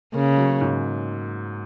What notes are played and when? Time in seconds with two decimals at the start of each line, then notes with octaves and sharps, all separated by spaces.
0.14 C#3 A#3
0.37 F#3
0.61 G#2